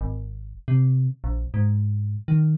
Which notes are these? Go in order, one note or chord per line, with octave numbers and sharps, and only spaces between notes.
G#1
C3
A#1
G#2
D#3